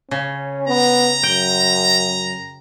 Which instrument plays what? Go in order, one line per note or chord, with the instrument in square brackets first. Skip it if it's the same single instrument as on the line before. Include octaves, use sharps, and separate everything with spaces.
[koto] C#3 [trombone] C#4
[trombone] B3 [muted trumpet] A#5
[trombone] F#2 [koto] G5